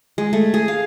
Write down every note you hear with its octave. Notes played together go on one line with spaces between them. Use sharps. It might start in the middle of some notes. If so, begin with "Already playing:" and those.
G#3
A3
G#4
F5